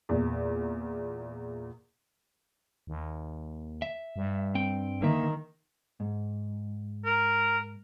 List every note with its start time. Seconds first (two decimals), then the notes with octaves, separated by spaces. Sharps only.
0.09 E2 A#2
2.87 D#2
3.82 E5
4.16 G2
4.55 C4 G5
5.02 D3 D#3 A#3 E5
6.00 G#2
7.05 A#4